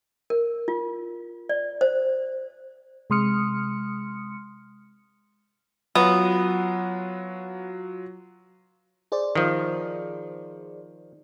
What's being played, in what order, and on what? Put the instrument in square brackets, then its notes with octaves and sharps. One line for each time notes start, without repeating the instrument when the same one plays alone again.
[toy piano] A#4
F4
D5
C5
[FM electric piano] C3 G#3 C6 D#6 F6 C#7
[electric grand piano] F#3 F4 F#4 [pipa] B3
[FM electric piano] G#4 C5 D5
[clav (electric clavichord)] D#3 F3